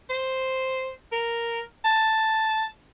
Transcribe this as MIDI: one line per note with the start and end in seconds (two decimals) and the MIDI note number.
0.10 0.92 72
1.12 1.61 70
1.85 2.65 81